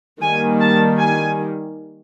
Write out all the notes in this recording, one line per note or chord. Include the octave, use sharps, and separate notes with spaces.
D#3 G3 A#3 G#5
A5
G#5